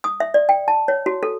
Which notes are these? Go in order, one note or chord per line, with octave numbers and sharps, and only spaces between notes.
D#6
E5
D5
G5
A5
C#5
F#4
A4